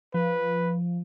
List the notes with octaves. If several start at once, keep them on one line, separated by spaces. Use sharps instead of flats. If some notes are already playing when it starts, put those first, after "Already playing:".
F3 B4